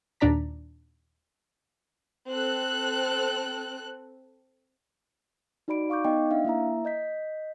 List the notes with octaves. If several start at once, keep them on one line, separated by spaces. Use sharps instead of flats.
D#2 A#2 D4 D5 A#5 B6
C4 A4 F#6
D#4 F#4 D5 B5 D7
F5 C#6 D6 G6
B3 D#4 D#5 G5
D4 E5 F5
A#3 E4 E5 A#5
D#5 G6 B6